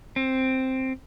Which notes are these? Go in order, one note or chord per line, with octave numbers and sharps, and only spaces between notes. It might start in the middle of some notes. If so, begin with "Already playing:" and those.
C4